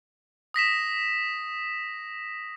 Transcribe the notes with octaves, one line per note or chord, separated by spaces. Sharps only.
D#6 A#6 B6 E7